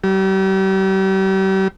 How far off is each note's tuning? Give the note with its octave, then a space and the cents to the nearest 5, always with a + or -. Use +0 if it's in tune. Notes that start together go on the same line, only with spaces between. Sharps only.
G3 -40